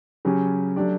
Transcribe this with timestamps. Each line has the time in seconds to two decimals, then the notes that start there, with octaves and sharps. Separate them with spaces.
0.25 C#3 F#3 C#4 G4
0.76 F#3 A3 D4 G4 D5